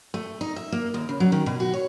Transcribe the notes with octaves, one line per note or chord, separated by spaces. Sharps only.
A3
D#4
E5
A#3
D#2
C#3
F#3
D#3
B2
F#4
C#5